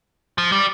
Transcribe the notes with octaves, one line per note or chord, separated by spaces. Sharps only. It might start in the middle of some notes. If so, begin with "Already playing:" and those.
F3
G3